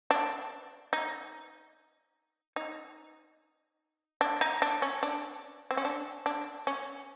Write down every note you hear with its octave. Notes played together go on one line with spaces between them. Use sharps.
D4
D#4
D#4
D4
D#4
D4
C#4
D4
C4
C#4
D4
D4
C#4